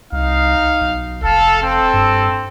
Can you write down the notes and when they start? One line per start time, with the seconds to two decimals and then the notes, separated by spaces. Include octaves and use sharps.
0.12 C2 D#4 F5
0.81 B1
1.24 F1 A4 F5
1.62 C4 A4
1.94 G2